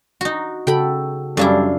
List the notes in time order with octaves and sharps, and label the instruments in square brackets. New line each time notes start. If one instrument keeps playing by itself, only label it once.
[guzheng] D#4 F#4
[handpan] C#3 F#4 A4 [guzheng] G5 B5
[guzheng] F#2 D4 E4 [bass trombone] G3 [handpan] A4 F5